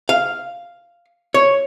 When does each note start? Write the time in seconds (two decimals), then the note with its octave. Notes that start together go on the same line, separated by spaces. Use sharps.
0.09 F5
1.34 C#5